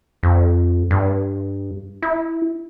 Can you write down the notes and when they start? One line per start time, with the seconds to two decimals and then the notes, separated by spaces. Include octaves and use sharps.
0.23 F2
0.91 G2
2.02 E4